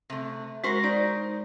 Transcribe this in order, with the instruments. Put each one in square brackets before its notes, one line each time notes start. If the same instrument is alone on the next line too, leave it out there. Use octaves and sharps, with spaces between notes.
[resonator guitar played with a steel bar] C3 A3
[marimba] G#3 A#6 [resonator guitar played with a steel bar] F#4 A#4 C5
[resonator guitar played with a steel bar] D#4 [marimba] C5 D5